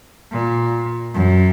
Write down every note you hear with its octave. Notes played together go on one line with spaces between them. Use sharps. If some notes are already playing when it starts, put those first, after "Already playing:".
A#2
F#2